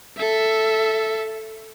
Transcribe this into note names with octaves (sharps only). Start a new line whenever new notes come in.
A4 E5